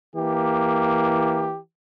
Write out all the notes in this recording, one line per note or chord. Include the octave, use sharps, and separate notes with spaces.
E3 A#3 G4